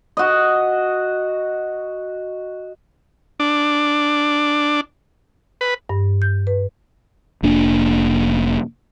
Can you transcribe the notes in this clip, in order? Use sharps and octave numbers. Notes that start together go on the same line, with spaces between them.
F#4 D#5
D4
B4
G2
G6
B4
F1 A#3 D4